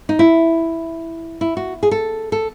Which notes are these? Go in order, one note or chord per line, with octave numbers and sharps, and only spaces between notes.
D#4
E4
E4
F#4
G#4
A4
A4